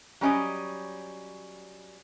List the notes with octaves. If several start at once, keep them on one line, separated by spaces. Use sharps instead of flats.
F#3 G3 C#4 D#5